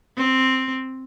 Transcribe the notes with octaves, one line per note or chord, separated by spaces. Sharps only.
C4